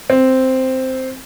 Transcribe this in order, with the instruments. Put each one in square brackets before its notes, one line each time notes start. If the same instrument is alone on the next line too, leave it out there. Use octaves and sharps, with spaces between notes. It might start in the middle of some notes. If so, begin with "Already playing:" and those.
[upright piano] C4